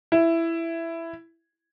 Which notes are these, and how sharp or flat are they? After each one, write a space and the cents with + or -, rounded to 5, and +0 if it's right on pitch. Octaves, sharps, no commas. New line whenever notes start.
E4 +10